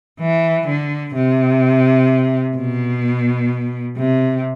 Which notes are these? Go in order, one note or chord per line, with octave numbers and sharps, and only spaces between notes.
E3
D3
C3
B2
C3